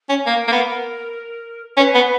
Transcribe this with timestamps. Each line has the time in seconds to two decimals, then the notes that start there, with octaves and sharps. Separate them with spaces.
0.09 C#4
0.26 A#3 A#4
0.47 A#3
0.52 B3
1.77 C#4 B4
1.95 B3